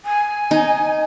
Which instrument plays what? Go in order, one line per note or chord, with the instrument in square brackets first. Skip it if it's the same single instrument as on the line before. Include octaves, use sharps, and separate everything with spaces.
[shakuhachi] G#5
[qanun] D#4